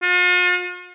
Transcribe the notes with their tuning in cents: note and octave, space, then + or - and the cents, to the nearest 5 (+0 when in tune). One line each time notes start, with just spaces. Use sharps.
F4 +45